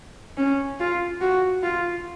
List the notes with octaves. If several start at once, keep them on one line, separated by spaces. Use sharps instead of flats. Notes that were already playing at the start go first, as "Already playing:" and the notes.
C#4
F4
F#4
F4